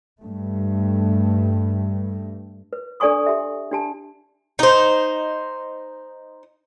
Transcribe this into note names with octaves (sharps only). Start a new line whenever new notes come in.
G2 A3
B4
D4 A4 D5 G#5 C#6 D#6
G4 E5
D4 G4 A5
D#4 C5